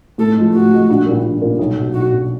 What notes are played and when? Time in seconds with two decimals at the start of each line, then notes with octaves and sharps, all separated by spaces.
0.18 A2 A4
0.37 F3 G#3
0.54 A2 F#4
0.72 F3 G#3
0.90 A#1
1.06 A#2 G3 A#3
1.24 A#1
1.42 A#2 G3 A#3
1.59 B1
1.77 B2 F#3
1.94 B1 F#4
2.12 B2 F#3